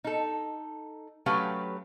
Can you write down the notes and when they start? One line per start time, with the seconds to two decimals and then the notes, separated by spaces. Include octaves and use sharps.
0.04 D#4 A4
1.26 F#3 A3 C#4 G4 B4 F5